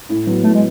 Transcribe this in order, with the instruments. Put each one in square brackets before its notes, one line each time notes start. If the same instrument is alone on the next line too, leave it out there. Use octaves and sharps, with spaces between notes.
[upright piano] A2
F#3 B3
[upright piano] A2 [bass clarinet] A3
[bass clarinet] G#3